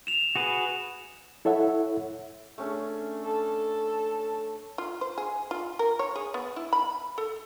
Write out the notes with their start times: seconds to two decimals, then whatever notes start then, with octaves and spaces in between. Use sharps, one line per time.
0.07 E7 F7
0.35 F#4 G#4 B4
1.45 E4 A4 C#5 E5 F#5
2.58 A3 C#4 D4
3.24 A4
4.78 F4
5.01 C5
5.18 G#4
5.51 F4
5.79 A#4
5.99 C#5
6.16 G#4
6.34 B3
6.56 E4
6.73 B5
7.18 A4